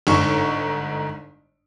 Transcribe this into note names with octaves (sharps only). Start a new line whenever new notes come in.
G1 G#2 C#6